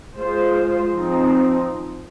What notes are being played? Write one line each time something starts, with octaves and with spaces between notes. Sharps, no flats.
G#3 F4 C5
F3 C4 D#4